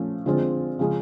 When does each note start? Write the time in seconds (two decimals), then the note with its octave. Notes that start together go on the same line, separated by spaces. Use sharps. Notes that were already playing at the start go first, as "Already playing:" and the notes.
Already playing: F3 A3 C#4
0.26 D3 F3 G#3 C4 F4
0.79 C#3 F3 G#3 C#4